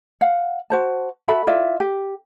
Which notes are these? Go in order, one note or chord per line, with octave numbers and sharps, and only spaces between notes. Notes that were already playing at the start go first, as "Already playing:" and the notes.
F5 F#5
F#4 C5 A5
F#4 A4 E5 B5
E4 F4 D5 E5
G4